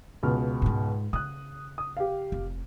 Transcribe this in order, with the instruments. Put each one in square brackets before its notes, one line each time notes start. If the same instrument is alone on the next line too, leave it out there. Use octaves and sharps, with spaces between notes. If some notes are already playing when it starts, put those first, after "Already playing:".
[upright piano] C#2 B2 F6
[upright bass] G#2 G#3
[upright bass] C#3 [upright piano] D#6 F#6
[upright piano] D#6
G4 F5
[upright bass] F1